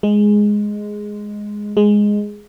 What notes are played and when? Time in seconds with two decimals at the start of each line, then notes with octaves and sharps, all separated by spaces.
0.03 G#3
1.77 G#3